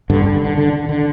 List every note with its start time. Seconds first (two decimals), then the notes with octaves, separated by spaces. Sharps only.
0.10 G2 D3
0.25 D3
0.42 D3
0.58 D3
0.73 D3
0.89 D3